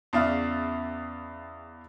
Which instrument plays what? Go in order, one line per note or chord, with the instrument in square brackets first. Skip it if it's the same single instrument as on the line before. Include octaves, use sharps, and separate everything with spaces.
[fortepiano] E2 C#3 D5 E5 F5